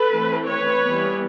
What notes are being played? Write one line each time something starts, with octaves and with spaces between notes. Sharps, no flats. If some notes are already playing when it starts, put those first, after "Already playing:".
Already playing: A4 B4
E3 A3 C4
B4 C#5
E3 G3 B3